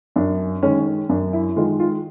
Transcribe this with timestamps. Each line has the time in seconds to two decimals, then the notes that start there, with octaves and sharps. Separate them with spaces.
0.16 F#2 D4
0.63 D#3 G#3 C#4
1.09 F#2 D4
1.33 E4
1.56 D#3 G#3 F4
1.79 F4